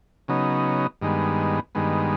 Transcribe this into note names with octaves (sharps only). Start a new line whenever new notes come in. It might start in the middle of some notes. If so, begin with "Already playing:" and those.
C#3 F#3 B3 D#4
G2 D#3 G#3 B3
G2 D#3 G#3 B3